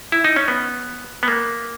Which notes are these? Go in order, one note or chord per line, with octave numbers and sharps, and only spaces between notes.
E4
D#4
C#4
B3
B3
A#3